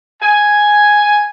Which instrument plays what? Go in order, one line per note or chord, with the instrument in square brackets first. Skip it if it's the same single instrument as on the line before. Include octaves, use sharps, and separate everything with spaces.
[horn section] G#5